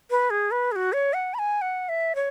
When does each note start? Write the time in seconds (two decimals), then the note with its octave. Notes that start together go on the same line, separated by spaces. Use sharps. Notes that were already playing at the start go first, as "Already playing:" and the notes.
0.10 B4
0.30 G#4
0.51 B4
0.72 G#4
0.76 F#4
0.93 C#5
1.13 F#5
1.34 B5
1.39 G#5
1.61 F#5
1.89 E5
2.15 C#5